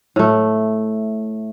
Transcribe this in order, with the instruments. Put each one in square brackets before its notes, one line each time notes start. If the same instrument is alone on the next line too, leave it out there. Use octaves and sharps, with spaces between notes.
[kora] A2 A3